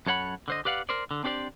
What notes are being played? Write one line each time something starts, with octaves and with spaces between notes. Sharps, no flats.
F#2 A4 C#5 F#5 B5
D3 C5 D#5
G4 B4 D5 F5 F#5
A#4 C5 D5
D3
C4 D4 G4 C5 D5